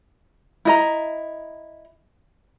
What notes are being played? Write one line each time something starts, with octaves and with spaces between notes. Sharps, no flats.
E4 D#5 A#5